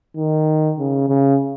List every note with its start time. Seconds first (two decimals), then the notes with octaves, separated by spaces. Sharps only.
0.17 D#3
0.79 C#3
1.09 C#3